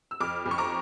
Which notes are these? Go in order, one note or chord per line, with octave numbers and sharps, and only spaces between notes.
E6
F2 D6 F6
F2
C#6
A#5 D6